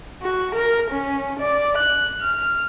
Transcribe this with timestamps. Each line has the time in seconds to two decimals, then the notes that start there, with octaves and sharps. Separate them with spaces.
0.22 F#4
0.55 A#4
0.91 C#4
1.39 D5
1.78 F#6
2.21 F6